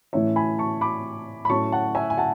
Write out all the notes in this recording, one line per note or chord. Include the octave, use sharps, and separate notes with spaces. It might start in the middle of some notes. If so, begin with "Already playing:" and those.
A2 E3 A3 C#4 C#5 E5
G#5 B5
A5 C#6
B5 D6
B5
A2 F#3 A3 C#4 A5 C#6
F#5 A5
E5 G#5
G#5
F#5 A5